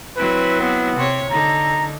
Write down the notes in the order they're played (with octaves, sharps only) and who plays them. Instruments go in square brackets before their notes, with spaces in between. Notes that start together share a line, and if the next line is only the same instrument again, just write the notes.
[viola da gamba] F#3 C4 E4 [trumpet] B4
[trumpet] B3
[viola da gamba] C3 C#5
[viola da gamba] D3 D#4 [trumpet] A#5